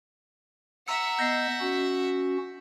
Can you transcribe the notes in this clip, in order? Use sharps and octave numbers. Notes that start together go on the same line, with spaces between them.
E5 F#5 A#5 E6 C#7
B3 D#5 G6 A#6 C7
C#4 F#4